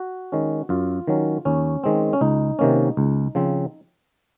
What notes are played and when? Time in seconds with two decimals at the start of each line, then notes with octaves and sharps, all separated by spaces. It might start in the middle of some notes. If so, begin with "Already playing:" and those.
Already playing: F#4
0.32 D#3 G#3 C#4
0.69 F#2 F4
1.07 D#3 F#3 C#4
1.45 D#2 C#4
1.84 D#3 G#3 C4
2.13 C#4
2.21 C#2 D#4
2.59 C3 D#3 A#3 C#4
2.97 C#2
3.35 C#3 F3 C4